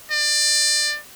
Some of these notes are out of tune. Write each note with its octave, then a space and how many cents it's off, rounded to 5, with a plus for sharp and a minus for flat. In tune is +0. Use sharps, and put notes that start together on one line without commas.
D5 +25